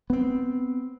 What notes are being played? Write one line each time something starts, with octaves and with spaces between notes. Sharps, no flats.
B3 C4